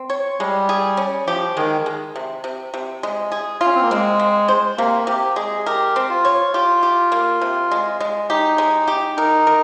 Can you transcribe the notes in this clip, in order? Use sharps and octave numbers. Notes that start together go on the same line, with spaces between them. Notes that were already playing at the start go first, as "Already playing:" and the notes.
Already playing: C4
C#5
G3 G#3
G#4
C#4
F3 G4
D#3 G#3
G#3
C3
C3
C3
G#3
G#4
F4
C#4
C4
A#3
G#3 C4
C4
C5
C3 A#3
C3 G4
G#3 G#4
G4 A#4
C4
F4
C#5
F4 G4
G4
A#3
C3
G#3
G#3
D#4 G4
G#3
G4
D#4 A#4
A#4